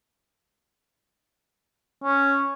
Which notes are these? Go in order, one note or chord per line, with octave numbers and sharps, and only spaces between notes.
C#4